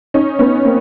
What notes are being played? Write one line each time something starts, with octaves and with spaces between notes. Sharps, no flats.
C#4 D#4
B3 C#4
A#3 C4